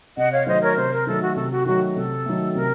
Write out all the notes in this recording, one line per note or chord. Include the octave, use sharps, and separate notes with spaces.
C3 D#5 F#5
C#5 F5
D#3 F#3 A3 C5 D#5
A#4 C#5
C3 C5
A#4
D#3 F#3 A3 A4
F#4
C3 A4
F#4
D#3 F#3 A3 F#4
C3 A4
D#3 F#3 A3
C3 A#4